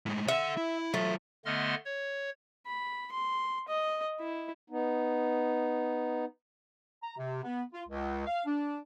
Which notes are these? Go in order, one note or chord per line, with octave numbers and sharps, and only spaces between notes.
A2 G#3
A4 E5 F#5
E4
F#3 A3 F4
D3 A3 B3 D#5 C6 F6
C#5
B5
C6
D#5
E4
B3 D#4
A#5
C3
B3
F4
C#2
F5
D4